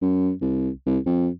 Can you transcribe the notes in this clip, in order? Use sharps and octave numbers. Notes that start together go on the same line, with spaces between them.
F#2
C2
C2
F2